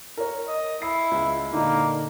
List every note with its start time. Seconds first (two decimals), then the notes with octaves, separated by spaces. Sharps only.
0.17 A#4 C#5
0.48 D#5
0.82 E4 C7
1.11 C#2
1.52 A#2 D3 A#3 D#4